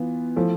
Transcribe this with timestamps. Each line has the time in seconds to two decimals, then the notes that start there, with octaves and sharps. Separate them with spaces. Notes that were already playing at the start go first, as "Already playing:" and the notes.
Already playing: E3 B3 F4
0.36 F3 A3 E4